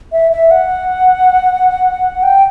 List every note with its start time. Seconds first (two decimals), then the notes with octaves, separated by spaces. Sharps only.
0.12 E5
0.32 E5
0.51 F#5
2.23 G5